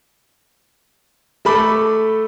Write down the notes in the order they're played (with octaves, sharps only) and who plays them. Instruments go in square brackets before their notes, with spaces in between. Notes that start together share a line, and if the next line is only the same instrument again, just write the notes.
[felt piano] A3 A4 B5 D6